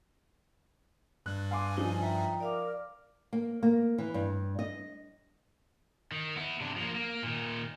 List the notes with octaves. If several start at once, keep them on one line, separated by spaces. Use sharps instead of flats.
G2 G3 F#6
F5 G#5 C6 D6
F3 D#4 E4
E5 G5 A#5
A#4 D5 F5 D6
A#3
A#3
E3
G2
D#5
D#3
B3 E4
C3 D4
F3 A#3
A#3
A#2 D#3